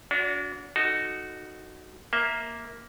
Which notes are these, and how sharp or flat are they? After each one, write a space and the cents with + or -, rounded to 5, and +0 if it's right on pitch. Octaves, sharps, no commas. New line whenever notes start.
D4 -35 F#4 -20 C#5 +25
D#4 -15 F#4 +0 A4 +0
A#3 +0 E5 -15